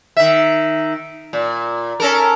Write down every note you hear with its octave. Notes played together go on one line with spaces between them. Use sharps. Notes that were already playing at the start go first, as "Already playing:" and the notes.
D#3 E5
A#2
C#4 A4 A#4